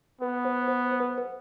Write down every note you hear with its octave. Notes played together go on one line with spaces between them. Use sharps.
B3 B4
C5
C5
C5
B4
B4